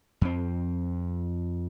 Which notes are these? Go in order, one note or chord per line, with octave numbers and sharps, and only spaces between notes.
F2 C4